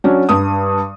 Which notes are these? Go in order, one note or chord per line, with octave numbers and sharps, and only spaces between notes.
F#3 C#4 D4
G2 D#6